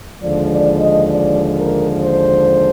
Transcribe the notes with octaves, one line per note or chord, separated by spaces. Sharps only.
D#2 D3 F3 G#3 D5
D5
D#5
D5
A#4
C5